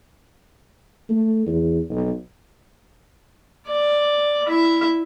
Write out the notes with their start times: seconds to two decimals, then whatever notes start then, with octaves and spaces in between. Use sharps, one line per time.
1.09 A3
1.46 E2
1.90 B1
3.67 D5
4.47 E4 E5